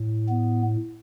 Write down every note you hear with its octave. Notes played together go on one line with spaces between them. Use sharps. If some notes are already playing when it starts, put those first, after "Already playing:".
Already playing: A2
B3